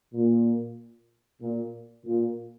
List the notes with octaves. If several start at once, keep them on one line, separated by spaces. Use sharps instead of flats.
A#2
A#2
A#2